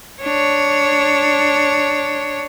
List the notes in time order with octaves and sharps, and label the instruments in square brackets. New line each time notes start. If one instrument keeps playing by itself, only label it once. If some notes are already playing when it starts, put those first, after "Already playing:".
[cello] D4 C#5